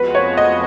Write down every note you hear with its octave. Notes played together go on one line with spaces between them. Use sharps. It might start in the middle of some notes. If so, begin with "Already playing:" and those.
Already playing: F2 F3 G#3 B3 F#4 B4
C#5
D#5